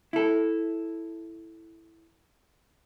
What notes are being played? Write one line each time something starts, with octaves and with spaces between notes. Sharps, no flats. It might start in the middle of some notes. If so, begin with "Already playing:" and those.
E4 A4